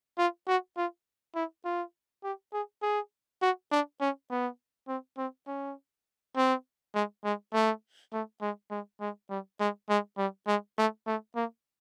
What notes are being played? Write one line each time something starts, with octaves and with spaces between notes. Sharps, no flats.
F4
F#4
F4
E4
F4
G4
G#4
G#4
F#4
D4
C#4
B3
C4
C4
C#4
C4
G#3
G#3
A3
A3
G#3
G#3
G#3
G3
G#3
G#3
G3
G#3
A3
A3
A#3